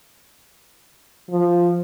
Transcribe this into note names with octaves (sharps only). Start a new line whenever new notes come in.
F3